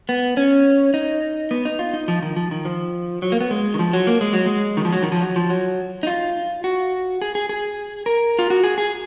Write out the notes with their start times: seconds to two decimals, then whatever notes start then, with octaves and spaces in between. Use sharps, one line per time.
0.09 B3
0.37 C#4
0.94 D#4
1.51 B3
1.65 D#4
1.79 F4
1.93 D#4
2.08 F3
2.22 D#3
2.36 F3
2.51 D#3
2.65 F3
3.22 F#3
3.32 A#3
3.41 B3
3.51 G#3
3.74 D#3
3.79 F3
3.93 F#3
4.07 A#3
4.21 G#3
4.33 F#3
4.46 G#3
4.77 D#3
4.85 F3
4.92 F#3
5.03 D#3
5.12 F3
5.21 F#3
5.36 F3
5.50 F#3
6.03 D#4
6.07 F4
6.64 F#4
7.22 G#4
7.35 G#4
7.49 G#4
8.06 A#4
8.39 F4
8.50 F#4
8.64 G#4
8.78 G#4